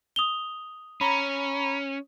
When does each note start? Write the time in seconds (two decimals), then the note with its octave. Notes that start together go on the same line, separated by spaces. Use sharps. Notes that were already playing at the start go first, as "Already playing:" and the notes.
0.16 D#6 F7 G7
1.01 C#4 A#5 B5